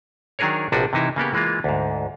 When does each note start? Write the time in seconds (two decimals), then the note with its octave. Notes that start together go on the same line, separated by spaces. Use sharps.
0.39 D#3 F#3 D4 G#4 A#4 C#5
0.72 A#1 C3 F3 D4 F#4 B4
0.93 C3 E3 D#4 E4
1.16 C#3 A#3 B3 G4
1.33 E3 G#3 A#3 F4
1.64 D2 G#2